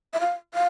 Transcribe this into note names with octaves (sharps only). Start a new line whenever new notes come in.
E5
F5
F5